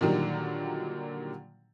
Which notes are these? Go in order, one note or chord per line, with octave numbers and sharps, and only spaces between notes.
A#2 D3 D#3 F#3 G3